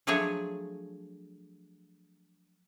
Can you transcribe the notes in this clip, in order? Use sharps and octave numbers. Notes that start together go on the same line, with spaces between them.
F3 F#3 A3 D4 G#4 C#5